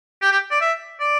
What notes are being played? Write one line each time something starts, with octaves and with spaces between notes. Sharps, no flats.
G4
G4
D5
E5
D5